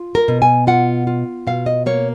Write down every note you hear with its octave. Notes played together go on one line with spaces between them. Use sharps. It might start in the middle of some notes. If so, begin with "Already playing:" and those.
Already playing: F4
A#4
B2
G#5
F4 F#5
F4
B2 F5
D#5
A#3 C#5